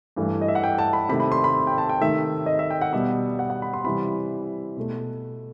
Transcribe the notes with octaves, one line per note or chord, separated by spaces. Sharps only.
G2 E3 A3
D#5
E5
F#5
G5
A5
B5
C3 D#3 A3 B5
B5
C6
B5
G5
A5
G5
C3 D#3 A3 E5
D#5
E5
G5
F#5
B2 G3 B3 E5
F#5
F#5
B5
C6
C3 E3 G3 B5
B2 A3